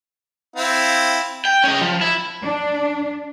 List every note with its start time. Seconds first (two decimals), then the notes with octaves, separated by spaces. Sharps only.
0.56 C4 E4 F5
1.45 G5
1.64 C#4 D#5
1.81 F3
2.01 E4
2.43 D4